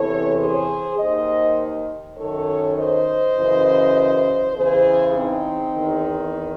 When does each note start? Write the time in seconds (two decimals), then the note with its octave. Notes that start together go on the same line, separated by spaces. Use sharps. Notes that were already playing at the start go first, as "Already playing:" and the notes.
Already playing: E2 C3 E3 A4 C#5
0.38 G#4 C5
0.97 D#2 D#3 C5 D#5
2.17 F#2 D#3 A4 C#5
2.77 C5 D#5
3.35 F#2 C#3 E3
4.54 E2 C#3 E3 G#4 C5
5.14 C4 D#4
5.74 E2 D#3